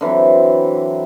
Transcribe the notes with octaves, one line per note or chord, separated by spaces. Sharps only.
D3 E3 F#3 C4